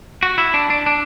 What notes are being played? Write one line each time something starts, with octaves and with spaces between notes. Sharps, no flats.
F#4
E4
D4
D4
D4